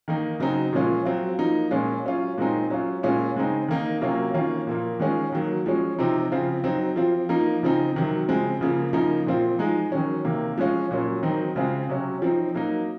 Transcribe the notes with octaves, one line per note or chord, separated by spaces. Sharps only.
D#3 A#3 D#4
C#3 F#3 C4 D#4
A#2 F3 G#3 C#4 F4
F#3 C4 F4
F3 A#3 D#4
A#2 G#3 C#4 F4
F#3 C#4 F4
A#2 G#3 C4 D#4
F#3 C#4 F4
A#2 G#3 C#4 F4
C#3 G#3 C4 D#4
D#3 A#3 D#4
C3 F#3 A#3 C#4 F4
D#3 A#3 C#4 F4
A#2 F3 A#3
D#3 G#3 C#4 F4
D#3 F#3 A#3
F3 G#3 C#4
C3 F3 C4 D#4
C#3 F3 C4 F4
F#3 C4 D#4
F3 C4 F4
F3 A#3 D#4
C#3 F3 C4 D#4
C3 D#3 F#3
C#3 F3 G#3 C4
C#3 F3 A#3
C#3 F3 A#3 D#4
A#2 F3 C4 F4
F3 G#3 D#4
D#3 F#3 C#4
C3 D#3 A#3
F3 G#3 C#4 F4
A#2 F#3 C#4
D#3 F#3 C4 D#4
C#3 G#3 C4 F4
C3 F#3 C#4
F3 C4 D#4
F#3 A#3 D#4